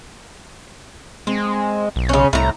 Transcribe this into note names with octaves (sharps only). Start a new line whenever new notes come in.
G#3 C4
B1
C#3 C#4
C2 A2 A#5